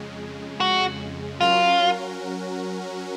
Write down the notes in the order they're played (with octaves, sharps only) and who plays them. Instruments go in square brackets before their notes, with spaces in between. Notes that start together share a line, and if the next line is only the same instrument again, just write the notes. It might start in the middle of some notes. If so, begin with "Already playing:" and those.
Already playing: [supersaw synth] F2 C#3 G#3
[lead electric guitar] F#4
[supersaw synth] F#3 C#4 F#4 A#4 [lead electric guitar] F4